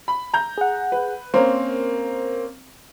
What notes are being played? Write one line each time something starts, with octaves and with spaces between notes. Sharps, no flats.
B5
A#5 G6
G#4 F#5
B4
A#3 C4 C#4 A#4 C5